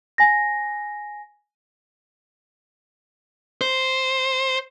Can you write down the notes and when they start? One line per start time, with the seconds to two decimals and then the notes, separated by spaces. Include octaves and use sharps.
0.18 G#5 A#6
3.61 C5